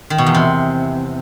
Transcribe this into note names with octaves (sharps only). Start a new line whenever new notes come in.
D#3
B2
E2
C3